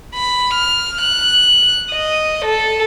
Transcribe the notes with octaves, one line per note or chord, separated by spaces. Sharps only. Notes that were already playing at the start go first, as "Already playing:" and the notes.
B5
F6
F#6
D#5
A4